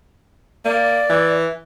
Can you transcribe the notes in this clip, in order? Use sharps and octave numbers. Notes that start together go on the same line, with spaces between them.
A#3 D5
E3